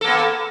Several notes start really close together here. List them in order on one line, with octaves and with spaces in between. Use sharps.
A4 A#3 B3